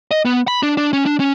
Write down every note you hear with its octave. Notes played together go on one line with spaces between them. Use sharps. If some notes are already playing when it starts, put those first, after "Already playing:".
D#5
B3
B5
D4
D4
C#4
D4
C#4